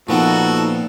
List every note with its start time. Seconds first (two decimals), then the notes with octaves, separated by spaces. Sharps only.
0.09 A#2 F3 B3 C4 D#4 F#4 A4